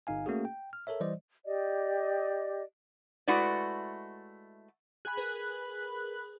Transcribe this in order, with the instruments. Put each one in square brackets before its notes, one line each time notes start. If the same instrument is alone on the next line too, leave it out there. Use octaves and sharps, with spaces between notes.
[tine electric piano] G1 D#4 F5 G#5
A3 A#3 C#4 F#4 G#4
G5
F6
A4 A#4 C#5 E5
E3 G3 C5 D5 D#5
[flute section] G4 D5 D#5
[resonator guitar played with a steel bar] G#3 A3 E4 F#4 B4 D5
[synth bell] G#4 G#5 [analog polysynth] B5 F#6
[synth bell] G#4 A#4 B4